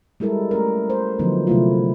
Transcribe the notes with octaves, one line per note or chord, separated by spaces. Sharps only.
G3 G#3 E4 A4 A#4
A3 C#4 A#4
C5
D3 F3 F#3 B3 D#4
C3 F3 F#3 A3 E4 F4